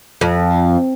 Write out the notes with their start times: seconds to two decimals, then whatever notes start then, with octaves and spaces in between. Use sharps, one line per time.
0.21 F2